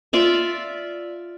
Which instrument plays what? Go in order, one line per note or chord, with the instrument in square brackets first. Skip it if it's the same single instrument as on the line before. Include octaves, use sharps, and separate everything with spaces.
[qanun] F4 D5 E5